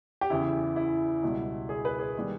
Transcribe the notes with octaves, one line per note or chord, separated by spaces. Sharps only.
G4
E2 C#3 E3 E4
E4
C#2 B2 G3
G#4
B4
G#4
D#3 G3